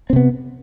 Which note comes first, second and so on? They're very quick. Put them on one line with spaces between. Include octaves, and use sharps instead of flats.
C4 C3 B3